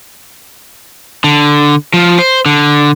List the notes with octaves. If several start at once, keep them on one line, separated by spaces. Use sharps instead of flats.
D3
F3
C5
D3